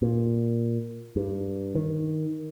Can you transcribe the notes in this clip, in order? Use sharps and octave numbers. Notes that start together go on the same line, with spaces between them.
A#2
G2
D#3